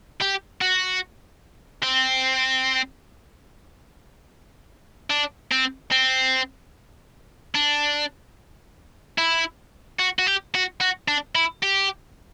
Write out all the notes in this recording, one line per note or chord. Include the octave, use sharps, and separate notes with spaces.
G4
F#4
C4
D4
C4
C4
D4
E4
F#4
F#4
G4
F#4
F#4
D4
E4
G4